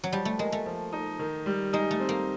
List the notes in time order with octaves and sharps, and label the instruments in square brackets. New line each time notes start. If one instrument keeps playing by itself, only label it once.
[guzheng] F#3
[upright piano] F3 [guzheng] G3
[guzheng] A3
[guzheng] G#3 [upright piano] A#3
[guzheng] A3
[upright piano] F3
D#4
D#3
G3
[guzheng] G#3 [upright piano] D#4
[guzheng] A3
[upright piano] C4
[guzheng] A#3